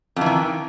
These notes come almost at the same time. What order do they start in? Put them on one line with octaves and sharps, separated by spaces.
F2 E3 D#3